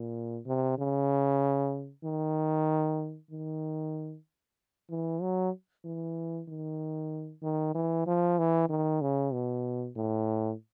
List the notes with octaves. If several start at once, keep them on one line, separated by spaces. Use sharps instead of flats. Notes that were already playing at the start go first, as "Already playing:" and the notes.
Already playing: A#2
C3
C#3
D#3
D#3
E3
F#3
E3
D#3
D#3
E3
F3
E3
D#3
C#3
B2
A2